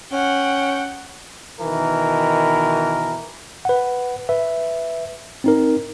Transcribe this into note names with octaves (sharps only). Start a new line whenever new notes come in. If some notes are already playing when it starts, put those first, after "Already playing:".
C#4 F#5 G5
B2 D#3 E3 A#4
B4 F#5
B4 E5
C4 D#4 A#4